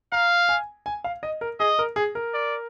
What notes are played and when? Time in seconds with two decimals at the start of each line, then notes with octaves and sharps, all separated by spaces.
0.12 F5 A#5
0.49 G#5
0.86 G#5
1.04 F5
1.23 D#5
1.41 A#4
1.60 G#4 D#5
1.79 A#4
1.96 G#4
2.15 A#4
2.34 D5